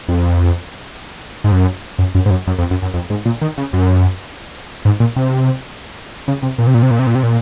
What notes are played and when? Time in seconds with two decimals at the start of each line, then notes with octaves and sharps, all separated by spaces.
0.08 F2
1.44 G#2
1.52 F#2
1.99 F#2
2.15 F#2
2.26 G#2
2.30 F#2
2.47 F#2
2.58 F2
2.70 F#2
2.82 F#2
2.94 F2
3.10 G#2
3.26 A#2
3.42 D#3
3.58 C#3
3.73 F#2
4.85 G#2
5.00 A#2
5.16 C3
6.28 C#3
6.43 C3
6.58 A#2
6.67 C3
6.74 A#2
6.82 C3
6.91 A#2
6.99 C3
7.07 A#2
7.15 C3
7.23 A#2